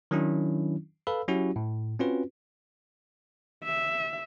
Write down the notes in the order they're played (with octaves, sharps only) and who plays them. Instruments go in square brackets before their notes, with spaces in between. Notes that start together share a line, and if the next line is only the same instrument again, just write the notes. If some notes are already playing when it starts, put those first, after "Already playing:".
[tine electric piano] D#3 F#3 C#4 D4 E4
A4 B4 F5 B5 E6
F#3 C#4 E4 F#4 G4
A2
C4 C#4 F4 F#4 B4
[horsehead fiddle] E5